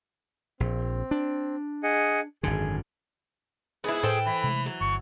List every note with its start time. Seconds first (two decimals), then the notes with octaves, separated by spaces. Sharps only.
0.60 A#1 C4
1.11 D4
1.83 G#4 D#5 F#5
2.43 G#1 F#2 D3 G#4
3.84 G#2 B3 E4 G#4 B4
4.03 A2 A4 B4 C5 G5
4.26 E3 B5
4.44 C3 G#3 A3
4.66 F#3
4.81 G1 C#6